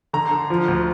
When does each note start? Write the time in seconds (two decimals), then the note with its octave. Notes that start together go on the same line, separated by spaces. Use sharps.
0.13 D3 A#5
0.31 D3
0.50 F3
0.68 D2